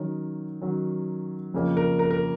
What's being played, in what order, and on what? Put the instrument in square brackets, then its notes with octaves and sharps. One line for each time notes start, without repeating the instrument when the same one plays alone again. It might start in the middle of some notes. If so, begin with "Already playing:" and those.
Already playing: [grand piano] D#3 F#3 C#4
D#3 F#3 C#4
F2 C#3 F3 A#3 C#4
A#4
A#4
A#4